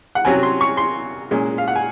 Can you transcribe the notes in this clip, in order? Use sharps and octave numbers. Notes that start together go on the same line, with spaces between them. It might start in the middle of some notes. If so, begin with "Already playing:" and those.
F#5
C3 F#3 C#4 G#5
C6
C#6
C6
A#2 G#3 C#4
F5
F#5
G#5